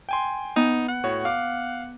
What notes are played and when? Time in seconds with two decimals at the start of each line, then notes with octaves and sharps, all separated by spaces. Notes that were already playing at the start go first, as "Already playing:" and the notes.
0.09 G5 G#5 C6
0.56 B3 D#4
0.88 F#5
1.04 A2 F#4 C#5
1.25 F5 D6